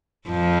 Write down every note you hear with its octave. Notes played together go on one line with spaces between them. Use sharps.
F2 F3